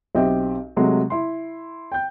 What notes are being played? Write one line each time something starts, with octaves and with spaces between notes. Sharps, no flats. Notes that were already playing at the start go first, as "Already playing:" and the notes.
B1 C4 G4 D#5 E5 G5
C3 F#3 G#3 A3
E4 C6
G5 G6